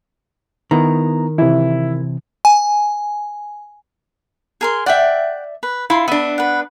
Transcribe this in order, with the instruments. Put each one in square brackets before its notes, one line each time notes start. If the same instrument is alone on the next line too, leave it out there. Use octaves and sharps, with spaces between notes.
[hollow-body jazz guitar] D#3 [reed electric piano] B3 E4 A#5
[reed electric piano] C3 E3 [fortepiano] E4
[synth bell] G#5
[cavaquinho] G#4 A#4 C6
[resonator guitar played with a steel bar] D5 E5 [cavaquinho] F#5 G5
[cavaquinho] B4
[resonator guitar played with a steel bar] E4 [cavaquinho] F4 C6
[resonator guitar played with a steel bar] B3 D4 [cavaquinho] E5
[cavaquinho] B4 F#5